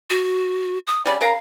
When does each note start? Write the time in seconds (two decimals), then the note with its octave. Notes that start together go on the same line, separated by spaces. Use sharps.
0.10 F#4
0.87 D#6
1.06 C#3 G3 D5
1.21 C#3 A#4 F5 A#5